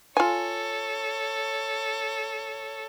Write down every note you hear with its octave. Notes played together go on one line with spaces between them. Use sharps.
F4 A4 C#5 G#5